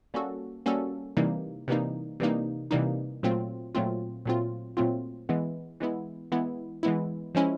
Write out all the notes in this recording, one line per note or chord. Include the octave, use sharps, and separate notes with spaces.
G3 A#3 C#4 F#4 A4
G3 A#3 C#4 F#4 A4
C3 E3 G3 A#3 D#4
C3 E3 G3 A#3 D#4
C3 E3 G3 A#3 D#4
C3 E3 G3 A#3 D#4
A#2 F#3 A3 C4 F4
A#2 F#3 A3 C4 F4
A#2 F#3 A3 C4 F4
A#2 F#3 A3 C4 F4
E3 G#3 B3 E4
E3 G#3 B3 E4
E3 G#3 B3 E4
E3 G#3 B3 E4
F3 G#3 C#4 E4